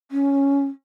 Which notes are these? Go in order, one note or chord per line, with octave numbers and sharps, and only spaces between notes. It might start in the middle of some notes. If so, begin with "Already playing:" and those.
C#4